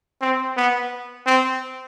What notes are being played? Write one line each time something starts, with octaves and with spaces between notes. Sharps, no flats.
C4
B3
C4